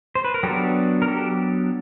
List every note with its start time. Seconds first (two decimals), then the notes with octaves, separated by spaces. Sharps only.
0.15 C5
0.24 B4
0.34 A#4
0.43 F#3 B3 D4 G4 A4
1.02 A#4
1.08 G4 A4